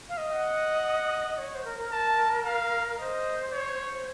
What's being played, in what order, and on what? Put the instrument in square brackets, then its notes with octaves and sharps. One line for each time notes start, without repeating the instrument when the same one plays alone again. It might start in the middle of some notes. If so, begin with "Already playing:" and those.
[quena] F5
D#5
[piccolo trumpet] F#5
[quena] C#5
C5
A#4
A#4
[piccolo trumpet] A5
F5
[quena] C5 [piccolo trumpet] D#5
[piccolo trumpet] C#5